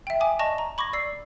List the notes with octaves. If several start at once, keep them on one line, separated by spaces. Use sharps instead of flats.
E5 G5
G#5 D6 D#6
D5 D#5 A5 C#6 A#6 F7
A#5
B5 C#6 D6 G#6 A#6
D5 E6 C7